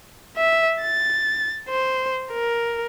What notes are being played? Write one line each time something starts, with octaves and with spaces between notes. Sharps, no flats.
E5
A6
C5
A#4